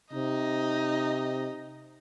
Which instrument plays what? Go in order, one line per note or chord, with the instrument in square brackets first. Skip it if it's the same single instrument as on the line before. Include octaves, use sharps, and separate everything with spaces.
[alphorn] C3 [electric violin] D#4 D#5